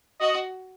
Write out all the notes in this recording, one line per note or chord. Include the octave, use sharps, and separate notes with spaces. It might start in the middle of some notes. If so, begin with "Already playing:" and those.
F#4 D#5